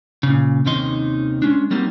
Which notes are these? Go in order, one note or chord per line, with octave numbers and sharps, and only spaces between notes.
A#2 C#3
D#2 C3 D#3 C#4 D#4 C6
G#3 C#4 D4
F#3 G3 A#3 C4 D#4